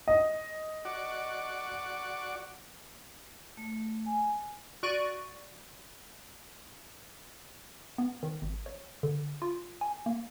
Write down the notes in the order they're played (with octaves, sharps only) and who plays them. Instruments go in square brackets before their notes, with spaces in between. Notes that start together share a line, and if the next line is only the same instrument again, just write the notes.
[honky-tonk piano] D#5
[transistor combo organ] F#4 D5
[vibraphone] A3
G#5
[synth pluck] F#4 D5 C#6 D#7
[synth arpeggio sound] B3
D#3
G#1
C#5
D3
F4
G#5
A#3